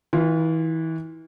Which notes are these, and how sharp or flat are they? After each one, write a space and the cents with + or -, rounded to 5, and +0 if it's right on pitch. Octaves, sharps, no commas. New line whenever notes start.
E3 -30 F4 +0